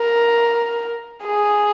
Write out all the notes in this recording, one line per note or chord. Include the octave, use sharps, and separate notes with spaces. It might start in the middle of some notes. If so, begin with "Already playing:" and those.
Already playing: A#4
G#4